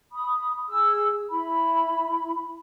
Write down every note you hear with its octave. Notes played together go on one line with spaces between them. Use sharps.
B5 D#6
G#4 E6
E4 B5